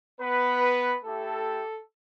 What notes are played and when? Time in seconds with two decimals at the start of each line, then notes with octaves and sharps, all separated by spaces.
0.21 B3 B4
1.04 A3 E4 G4 A4